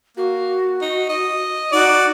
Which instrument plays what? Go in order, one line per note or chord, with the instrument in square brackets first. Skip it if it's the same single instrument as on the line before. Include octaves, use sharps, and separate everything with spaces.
[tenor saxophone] A#3 [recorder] F#4
[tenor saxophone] D#4
D#5
[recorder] D#4 [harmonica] F#4 D5